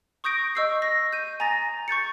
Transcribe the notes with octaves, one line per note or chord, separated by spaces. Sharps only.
C#6 D#6 G6 A#6 D7
D#5 C#6 E6 G6 C7
A#6
G6 D#7
G#5 A#5 D#6 A6 A#6
C#6 G6 A6 C#7